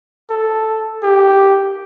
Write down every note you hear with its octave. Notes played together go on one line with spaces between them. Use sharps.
A4
G4